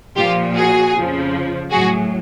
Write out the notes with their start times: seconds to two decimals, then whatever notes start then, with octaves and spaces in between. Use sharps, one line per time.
0.16 A#2 F3 F4 G4
0.55 F#4 G#4
0.94 F2 C#3 F3
1.70 A2 F#3 F#4 G#4